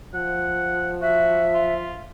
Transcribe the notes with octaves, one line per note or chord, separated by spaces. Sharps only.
F3 F#5
F#4 E5
F4